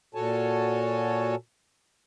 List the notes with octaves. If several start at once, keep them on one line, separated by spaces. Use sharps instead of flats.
A#2 F#4 A4 C#5 G#5 A5